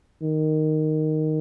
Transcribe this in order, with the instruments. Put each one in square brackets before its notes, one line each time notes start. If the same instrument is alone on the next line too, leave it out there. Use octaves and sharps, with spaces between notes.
[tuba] D#3